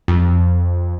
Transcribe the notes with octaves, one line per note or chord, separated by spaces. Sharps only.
F2